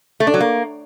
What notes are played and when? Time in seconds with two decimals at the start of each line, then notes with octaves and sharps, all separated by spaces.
0.20 A3
0.27 D4
0.34 F#3
0.40 A#3